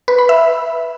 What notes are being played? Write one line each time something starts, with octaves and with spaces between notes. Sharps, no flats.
B4
B5
E5